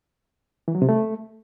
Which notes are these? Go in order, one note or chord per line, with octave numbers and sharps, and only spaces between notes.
E3
F#3
C3
A3